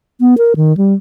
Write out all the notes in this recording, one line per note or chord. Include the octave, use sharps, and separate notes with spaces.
B3
A#4
D#3
G3